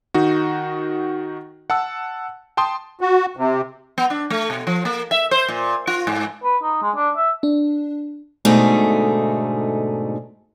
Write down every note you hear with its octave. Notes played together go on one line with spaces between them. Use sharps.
D#3 D#4 F#4
F#5 A5 E6
G5 A5 C6 D#6
F#4
C3
B3
D4
A3
B2
F3
A#3
E5
C5
A#2
F4
G#2
B4
D#4
G#3
D4
E5
D4
G#2 B2 D3 A3 D#4 G#4